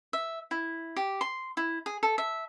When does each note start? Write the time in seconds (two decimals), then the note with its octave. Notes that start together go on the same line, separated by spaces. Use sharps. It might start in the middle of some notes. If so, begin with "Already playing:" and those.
0.13 E5
0.51 E4
0.96 G4
1.21 C6
1.57 E4
1.86 G#4
2.03 A4
2.18 E5